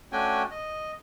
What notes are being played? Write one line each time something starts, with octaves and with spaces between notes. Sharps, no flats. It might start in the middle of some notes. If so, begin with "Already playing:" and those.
A3 C#4 D4 F#4 G5 G#5
D#5